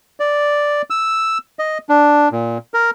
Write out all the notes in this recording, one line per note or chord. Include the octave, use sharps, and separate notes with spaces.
D5
E6
D#5
D4
A#2
A#4